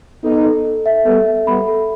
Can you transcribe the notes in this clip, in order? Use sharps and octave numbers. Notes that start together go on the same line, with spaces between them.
B3 D#4 A4
A4
A4
E5
G3 B3 A4
E5
G3 B3 B5
A4